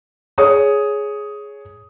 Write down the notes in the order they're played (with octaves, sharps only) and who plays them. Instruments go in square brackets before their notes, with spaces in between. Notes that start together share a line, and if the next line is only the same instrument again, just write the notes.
[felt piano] G#4 C#5 D#6